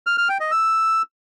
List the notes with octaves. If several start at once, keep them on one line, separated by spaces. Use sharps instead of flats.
F6
F6
G5
D#5
E6